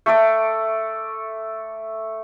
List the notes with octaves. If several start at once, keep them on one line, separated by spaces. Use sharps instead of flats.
A3 A4 D5